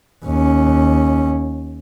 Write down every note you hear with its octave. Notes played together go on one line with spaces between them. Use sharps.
D#2 C#4